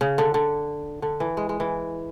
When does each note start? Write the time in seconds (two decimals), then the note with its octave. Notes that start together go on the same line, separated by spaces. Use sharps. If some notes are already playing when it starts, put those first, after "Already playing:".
0.01 C#3
0.18 D3
0.34 D3
1.02 D3
1.20 E3
1.37 G#3
1.49 G#3
1.60 E3